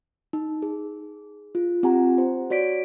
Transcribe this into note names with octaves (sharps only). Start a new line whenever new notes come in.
D#4
G#4
F4
C4 F4 G4 F#5 G#5 A#5
C5
F#4 C#5 D5 B6 D7